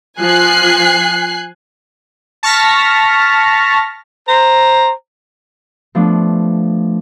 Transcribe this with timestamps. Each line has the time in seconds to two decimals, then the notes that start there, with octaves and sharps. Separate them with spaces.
0.20 F3 F4 G#5 F#6 C7
2.43 A5 C#6 F6 A#6 B6
4.28 C5 A#5
5.95 F3 A3 B3 D4